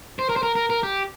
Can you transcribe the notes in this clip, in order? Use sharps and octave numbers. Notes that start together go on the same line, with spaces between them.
C5
A#4
C5
A#4
A#4
A#4
G4